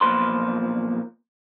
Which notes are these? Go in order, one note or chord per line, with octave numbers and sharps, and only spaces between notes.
B1 E2 A#2 F3 B4 C6